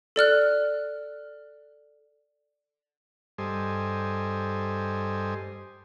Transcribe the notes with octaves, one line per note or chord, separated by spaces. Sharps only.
A4 D5 F6 F#6
G2 G3 A4 C5 D#5 G#5